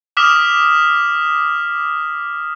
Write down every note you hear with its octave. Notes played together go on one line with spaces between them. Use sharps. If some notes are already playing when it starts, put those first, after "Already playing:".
D6 D#6 F6 B6 E7